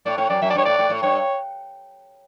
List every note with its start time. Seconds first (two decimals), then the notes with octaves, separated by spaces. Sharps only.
0.06 A2 D5
0.18 A2 C#5
0.30 F#2 D5
0.41 F#2 E5
0.50 D5
0.55 G2 C#5
0.65 A2 D5
0.79 A2
0.90 A2
1.03 G2 C#5